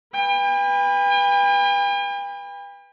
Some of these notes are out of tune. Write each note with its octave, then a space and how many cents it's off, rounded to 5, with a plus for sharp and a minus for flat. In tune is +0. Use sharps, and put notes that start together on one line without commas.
B4 -5 G5 +45